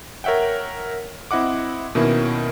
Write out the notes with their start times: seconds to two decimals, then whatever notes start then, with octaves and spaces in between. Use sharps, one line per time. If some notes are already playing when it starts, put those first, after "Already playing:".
0.24 A#4 C#5 E5 F#5 G5
1.31 C4 E4 D#5 F#5 D6
1.95 B2 D#3 A#3 C#4 E4